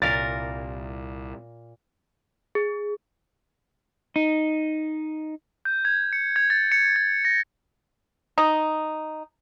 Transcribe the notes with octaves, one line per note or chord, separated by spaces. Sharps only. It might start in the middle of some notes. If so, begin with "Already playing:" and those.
C2 A#2 A#4 A6
G#4
D#4
G6
G#6
C#7
G#6
A6
C#7
A6
A#6
D#4